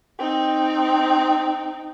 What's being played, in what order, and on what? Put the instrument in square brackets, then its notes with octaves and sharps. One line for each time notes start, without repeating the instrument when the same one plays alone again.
[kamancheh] C4 D#4